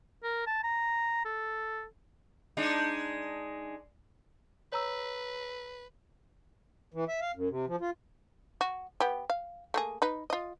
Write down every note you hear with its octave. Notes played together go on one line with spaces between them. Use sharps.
A#4
A5
A#5
A4
G#3 D4 D#4
B4 C#5 A#5 E6
E3
E5
F5
F#2
C3
F3
F4
F#4
B3 G4
F5
A3 A#3 G#4
D#4 B4
F4 D#5